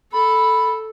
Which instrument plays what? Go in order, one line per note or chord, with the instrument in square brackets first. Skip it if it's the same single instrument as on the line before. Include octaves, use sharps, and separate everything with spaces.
[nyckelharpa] A4 [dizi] B5